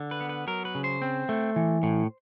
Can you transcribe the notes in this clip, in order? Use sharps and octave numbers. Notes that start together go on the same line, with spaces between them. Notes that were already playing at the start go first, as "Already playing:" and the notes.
Already playing: D3
B4
B3
B4
F#3 A#4
B4
C#3
C5
C4
A3
E3
A2